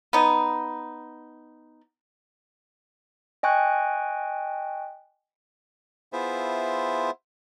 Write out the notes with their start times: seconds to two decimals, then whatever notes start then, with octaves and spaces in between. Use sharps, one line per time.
0.13 B3 D#4
3.43 D#5 G5 G#5 C#6 F#6
6.13 B3 E4 F4 G#4 C5 E5